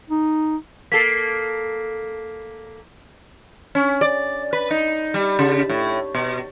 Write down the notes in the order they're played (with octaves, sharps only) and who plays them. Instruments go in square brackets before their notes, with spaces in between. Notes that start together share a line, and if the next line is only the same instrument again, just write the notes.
[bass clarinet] D#4
[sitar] A#3 A4 [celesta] B6 C7
[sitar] C#4
D5
B4
D#4
G3
C#3
A2
B2